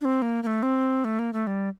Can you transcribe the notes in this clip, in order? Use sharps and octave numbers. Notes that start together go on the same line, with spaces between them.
D4
C4
A#3
A#3
A3
C4
A3
A#3
A3
G3